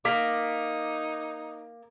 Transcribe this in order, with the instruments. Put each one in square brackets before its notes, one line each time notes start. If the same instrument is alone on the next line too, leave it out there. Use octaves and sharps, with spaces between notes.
[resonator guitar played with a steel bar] A#3 [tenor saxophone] D#4 [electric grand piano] D6 B6